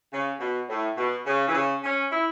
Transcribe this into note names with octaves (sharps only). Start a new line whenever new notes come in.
C#3
B2
A2
B2
C#3
E3
C#3
C#4
E4